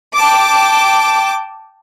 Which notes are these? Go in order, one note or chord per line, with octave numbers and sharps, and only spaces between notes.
G5 A5 D6